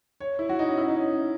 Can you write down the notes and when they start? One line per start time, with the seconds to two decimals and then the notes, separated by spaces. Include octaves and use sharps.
0.20 C#5
0.39 E4
0.49 F#4
0.59 D#4
0.68 C#4
0.78 E4
0.88 D#4
0.97 C#4